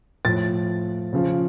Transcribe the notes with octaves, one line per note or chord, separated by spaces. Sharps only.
A2 F3 A6
C#3 F3